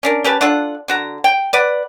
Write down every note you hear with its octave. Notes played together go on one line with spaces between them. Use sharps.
C#4 D4 A#4
C#4 G4 B4 A5
D4 F4 A4 F#5
D3 F#4 A#5
G5
B4 D5 F#5